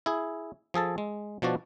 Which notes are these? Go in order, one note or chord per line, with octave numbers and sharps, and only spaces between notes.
E4 G#4
F3 G#4 A4 A5
G#3
B2 F3 D4 F#4 D5